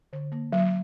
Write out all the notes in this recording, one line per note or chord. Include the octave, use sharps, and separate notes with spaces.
D3
A#3
F#3